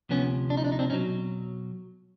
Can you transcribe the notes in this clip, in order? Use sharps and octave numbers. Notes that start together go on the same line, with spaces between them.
D2 C3 F3 B3 C#4
D4
D#4
D4
D#4
C4 D4
B2 F#3 C#4 D#4